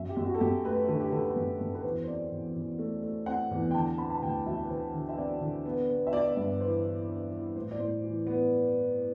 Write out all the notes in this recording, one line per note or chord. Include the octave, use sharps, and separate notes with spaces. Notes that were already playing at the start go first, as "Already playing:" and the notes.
Already playing: F#2 E5
G4
F#2
F#4
A4
F#2 G4
A3 B4
D3 A4
G4
D3 A4
B4
F#2
F#2
B4
E2 C5
C5
C4 D5
E2
E2
A3
A3
C4 F#5
E2
G5
D3 A5
C4 B5
A5
D2 G5
F#3 E5
B4
D3 C5
D3
E5
C4 D5
D3
B3
B3
E5
B3 D5
D5
G2 E5
B4
E3 C5
E3
D4
E3
A2 C5
D5
A2 C5
E3
B3